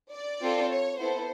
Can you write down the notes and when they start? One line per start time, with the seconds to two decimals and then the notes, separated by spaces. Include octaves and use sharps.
0.13 D5
0.41 C4 F4 A4
0.70 C#5
0.98 B3 E4 A4 C5